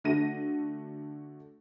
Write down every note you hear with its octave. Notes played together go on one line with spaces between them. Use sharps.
D3 A3 F#4 A#6 D#7